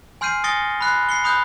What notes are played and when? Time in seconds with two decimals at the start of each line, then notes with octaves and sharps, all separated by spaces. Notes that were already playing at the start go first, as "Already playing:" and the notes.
0.21 G#5 C6 F6 G6 C7 D#7
0.44 G#5 D#6 A6 A#6 C#7 G7
0.81 B5 F#6 C7
1.09 C7 C#7 G7
1.24 B5 D#6 F#6 G6